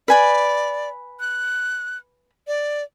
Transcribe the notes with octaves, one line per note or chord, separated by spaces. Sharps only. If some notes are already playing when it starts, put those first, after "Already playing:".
B4 D5 G#5 B5
F#6
D5